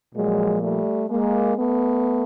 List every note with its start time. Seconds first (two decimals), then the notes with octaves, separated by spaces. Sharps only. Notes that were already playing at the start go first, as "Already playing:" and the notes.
0.15 A#2 F3 F#3 G#3
0.62 G3 A3
1.10 G#3 A#3
1.57 A3 B3